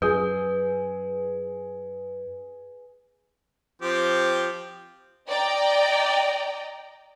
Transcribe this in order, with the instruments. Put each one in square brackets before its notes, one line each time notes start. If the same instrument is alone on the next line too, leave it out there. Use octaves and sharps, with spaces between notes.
[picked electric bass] F#2 [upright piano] G#4 D#6 G6 [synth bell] B4
[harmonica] F3 C4 G4
[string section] D5 D#5 G5 A#5